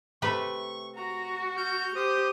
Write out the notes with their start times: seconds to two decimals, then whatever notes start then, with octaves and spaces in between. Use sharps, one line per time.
0.22 C3 A3 B4 C#6
0.96 F#4 A#5
1.57 F6 G6
1.95 G4 C5 D#6